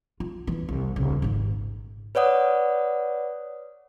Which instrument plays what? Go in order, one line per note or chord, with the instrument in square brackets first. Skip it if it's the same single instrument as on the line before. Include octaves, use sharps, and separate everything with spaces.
[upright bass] F4
E2 E3
C2
D#1 C#3
D#1 G#1
[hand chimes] B4 C#5 D5 F#5 D#6